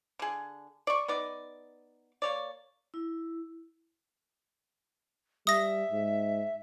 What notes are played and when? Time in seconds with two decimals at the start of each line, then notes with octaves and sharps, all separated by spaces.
0.19 D3 G#4
0.87 D5 C#6
1.08 B3 D#4 D5
2.22 A#3 C#5 D5
2.94 E4
5.47 G3 E5 D#6 A#6
5.92 G#2